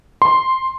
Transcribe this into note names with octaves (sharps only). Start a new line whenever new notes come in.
C6